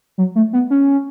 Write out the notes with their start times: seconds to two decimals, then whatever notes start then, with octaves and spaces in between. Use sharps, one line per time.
0.18 F#3
0.35 A3
0.53 B3
0.70 C#4